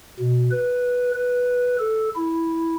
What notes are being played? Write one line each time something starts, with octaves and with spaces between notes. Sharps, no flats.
B2
B4
B4
A4
E4